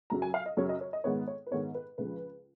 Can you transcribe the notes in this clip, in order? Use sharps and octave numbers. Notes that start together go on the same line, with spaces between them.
F#2 C#3 F#3 A#5
G#5
F5
D#5
F#2 C#3 F#3 C#5
D#5
C#5
D#5
G#2 D#3 G#3 B3 C#5
C#5
B4
G#2 D#3 G#3 B3 C#5
B4
C#2 C#3 F3 B4